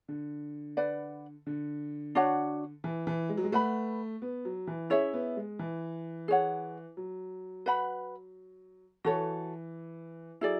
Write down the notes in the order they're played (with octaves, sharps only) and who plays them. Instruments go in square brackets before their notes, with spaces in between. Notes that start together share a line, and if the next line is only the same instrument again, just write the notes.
[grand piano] D3
[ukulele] B4 D5 F#5
[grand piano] D3
[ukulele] D4 F#4 C#5 F#5
[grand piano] E3
E3
G#3
F#3
G#3
[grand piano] A3 [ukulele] B4 F#5 B5
[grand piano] B3
F#3
E3
[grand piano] C#4 [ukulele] E4 G#4 C#5 E5
[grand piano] B3
G#3
E3
[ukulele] G#4 C#5 F#5
[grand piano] F#3
[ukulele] B4 F#5 B5
[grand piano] E3 [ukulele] F#4 A4 C#5
[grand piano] F#3 [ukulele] E4 G#4 D5